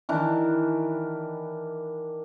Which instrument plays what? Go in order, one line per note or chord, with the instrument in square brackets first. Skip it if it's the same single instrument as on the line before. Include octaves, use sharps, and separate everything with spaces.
[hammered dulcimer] D#3 E3 D4